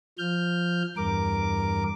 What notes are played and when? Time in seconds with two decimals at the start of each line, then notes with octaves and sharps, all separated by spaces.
0.18 F3 F6 G6
0.97 E2 G2 A#4 D6